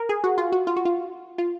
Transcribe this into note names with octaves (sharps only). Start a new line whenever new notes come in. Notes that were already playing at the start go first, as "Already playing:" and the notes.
Already playing: A#4
G#4
F#4
F4
F#4
F4
F#4
F4
F4